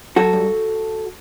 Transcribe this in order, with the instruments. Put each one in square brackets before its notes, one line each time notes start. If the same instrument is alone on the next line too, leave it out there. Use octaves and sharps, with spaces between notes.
[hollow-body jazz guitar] F#3 F#4 A4
G2